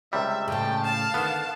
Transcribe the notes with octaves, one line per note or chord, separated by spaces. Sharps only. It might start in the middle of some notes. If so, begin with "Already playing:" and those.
C#2 C3 G3 E5
A2 C#3 G5 A5
F5 A5
D3 D#3 B3